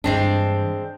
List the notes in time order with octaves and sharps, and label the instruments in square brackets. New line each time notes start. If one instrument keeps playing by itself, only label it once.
[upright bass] G2 E3 [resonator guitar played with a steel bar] G#3 C4 D4